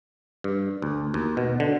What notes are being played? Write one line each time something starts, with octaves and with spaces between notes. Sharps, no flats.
G2
D2
D#2
B2
D3